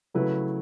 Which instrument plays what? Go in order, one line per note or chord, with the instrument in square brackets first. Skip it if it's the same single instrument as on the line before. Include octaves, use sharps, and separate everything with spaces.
[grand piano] C#3 F#3 A3 E4 B4